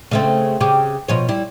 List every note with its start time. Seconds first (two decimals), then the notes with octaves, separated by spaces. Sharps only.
0.11 C#3 A3 C4
0.61 C#3 G4
1.08 B2 F3 C#5
1.29 G3 E4